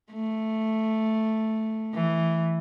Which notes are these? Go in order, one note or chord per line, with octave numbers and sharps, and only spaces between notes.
A3
E3